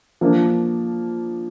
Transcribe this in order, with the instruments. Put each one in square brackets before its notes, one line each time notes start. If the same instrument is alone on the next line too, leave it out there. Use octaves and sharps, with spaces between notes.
[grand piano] F3 A#3 D4